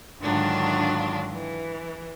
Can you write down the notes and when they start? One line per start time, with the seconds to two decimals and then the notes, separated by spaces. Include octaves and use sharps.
0.22 G#2 D3 D#3 F#3 D4 F4
1.33 E3